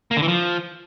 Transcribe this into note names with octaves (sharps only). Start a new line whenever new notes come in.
A#3
D3
E3
F3